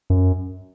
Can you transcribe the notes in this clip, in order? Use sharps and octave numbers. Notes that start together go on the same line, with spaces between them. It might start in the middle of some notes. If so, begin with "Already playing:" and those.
F#2